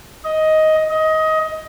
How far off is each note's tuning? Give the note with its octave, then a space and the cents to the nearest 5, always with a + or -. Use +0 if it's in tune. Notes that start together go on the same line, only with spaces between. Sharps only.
D#5 +10
D#5 +20